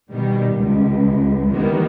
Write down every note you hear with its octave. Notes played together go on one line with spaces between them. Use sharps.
B2 D#3 G3
C#2
D#3 E3 G3 A#3 B3